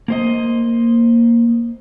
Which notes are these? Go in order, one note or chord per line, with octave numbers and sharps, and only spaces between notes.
A#3 C5 D#5